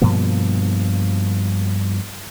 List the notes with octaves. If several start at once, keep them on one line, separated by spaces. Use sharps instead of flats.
G2 B2 F3 A#3